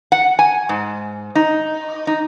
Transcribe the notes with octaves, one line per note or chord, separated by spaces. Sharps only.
F#5
G#5
G#2
D#4
D#4